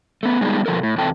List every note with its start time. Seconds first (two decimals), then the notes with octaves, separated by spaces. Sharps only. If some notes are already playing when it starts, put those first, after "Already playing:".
0.23 A3 B3
0.41 G3 G#3 B3 D#4 G#4
0.66 B2 F3 A#3 A4 A#4
0.83 A2
0.98 E2 C3 C4 A4 G5 A5